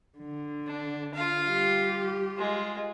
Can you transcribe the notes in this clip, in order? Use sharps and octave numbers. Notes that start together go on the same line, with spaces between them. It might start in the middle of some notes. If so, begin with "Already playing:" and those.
D3
D4
F4 F5
G3 G4
G#3 F4